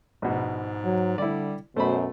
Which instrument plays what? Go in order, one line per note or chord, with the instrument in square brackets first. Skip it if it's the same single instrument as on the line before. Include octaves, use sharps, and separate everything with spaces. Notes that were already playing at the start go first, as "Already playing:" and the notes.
[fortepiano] A#1 B2 [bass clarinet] G#2
[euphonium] F#3
[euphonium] D3 [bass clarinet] G3 [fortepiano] E4 D5
[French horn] F#2 [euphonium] B2 [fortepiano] A3 B5 [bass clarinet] C5